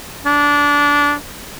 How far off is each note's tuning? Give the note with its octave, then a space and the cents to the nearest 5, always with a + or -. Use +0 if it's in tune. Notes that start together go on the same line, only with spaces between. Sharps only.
D4 -20